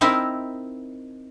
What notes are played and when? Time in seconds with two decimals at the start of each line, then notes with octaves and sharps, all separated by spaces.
0.01 C4 D#4 E4 A#4